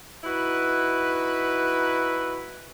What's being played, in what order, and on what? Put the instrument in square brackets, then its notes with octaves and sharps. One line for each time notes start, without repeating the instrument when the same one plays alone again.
[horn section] D#4 E4 F#4 B4